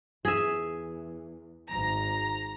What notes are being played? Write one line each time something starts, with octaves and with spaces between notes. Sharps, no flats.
E2 G#4 E5
G#1 G#2 A#5